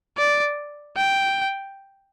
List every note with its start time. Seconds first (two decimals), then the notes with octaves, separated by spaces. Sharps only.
0.17 D5
0.96 G5